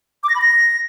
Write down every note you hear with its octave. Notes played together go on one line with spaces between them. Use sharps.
D6
A#6
B5
A#6